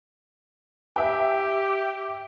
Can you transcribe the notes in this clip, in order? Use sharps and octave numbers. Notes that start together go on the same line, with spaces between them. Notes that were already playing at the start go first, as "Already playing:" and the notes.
G4 E5 G5